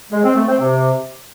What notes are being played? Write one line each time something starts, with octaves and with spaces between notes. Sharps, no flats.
G#3
C4
A3
C4
C3